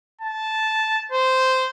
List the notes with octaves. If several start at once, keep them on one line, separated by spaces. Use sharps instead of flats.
A5
C5